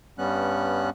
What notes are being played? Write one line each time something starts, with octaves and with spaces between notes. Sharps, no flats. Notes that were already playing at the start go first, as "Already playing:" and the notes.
G2 G3 B3 C#4 F#6